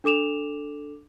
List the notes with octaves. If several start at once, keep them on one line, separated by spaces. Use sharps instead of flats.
D4 A4 D6 E7 F7